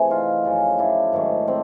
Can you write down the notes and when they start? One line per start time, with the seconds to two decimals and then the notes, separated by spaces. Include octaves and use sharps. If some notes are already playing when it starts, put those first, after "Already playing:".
Already playing: C3 E3 A3 C4 G#4
0.10 D#4 F4
0.44 F#2 C#3 F3
0.78 D4 E4
1.13 G#2 D#3 F#3 A3
1.48 C4 D4